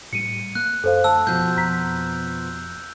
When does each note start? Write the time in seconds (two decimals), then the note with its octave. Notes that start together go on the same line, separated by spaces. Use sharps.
0.13 A2 G3 C#7 D#7
0.55 A#3 F#6
0.84 F#2 A4 C5 F5
1.04 D2 A5 E6
1.27 F1 B2 F3 G6
1.57 F2 A#5 B6